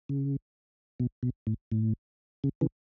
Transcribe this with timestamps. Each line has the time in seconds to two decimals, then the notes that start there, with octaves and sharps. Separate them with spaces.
0.09 C#3
1.00 B2
1.23 B2
1.47 A2
1.72 A2
2.44 C#3
2.61 C#3 E3